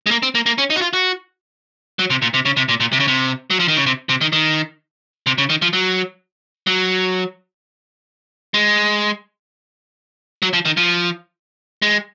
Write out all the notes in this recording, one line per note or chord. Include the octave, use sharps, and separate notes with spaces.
G#3
A#3
C4
A#3
A#3
C#4
D#4
F#4
F4
F#4
F#3
C3
A#2
C3
C#3
C3
A#2
A#2
C3
C#3
C3
F#3
F3
D#3
C#3
C3
C3
D#3
D#3
C3
C#3
D#3
F3
F#3
F#3
G#3
F#3
F3
D#3
F3
G#3